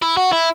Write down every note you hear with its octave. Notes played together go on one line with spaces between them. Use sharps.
E4
F#4
E4